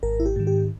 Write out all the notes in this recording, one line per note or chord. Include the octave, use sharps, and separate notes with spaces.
G#1 A#4
E4
G4
G#2 D#3
G4